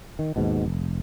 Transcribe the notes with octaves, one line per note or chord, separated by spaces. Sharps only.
D#3
D#2 G#2 B2
F1